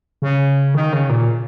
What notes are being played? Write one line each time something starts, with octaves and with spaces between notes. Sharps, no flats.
C#3
D#3
C#3
A#2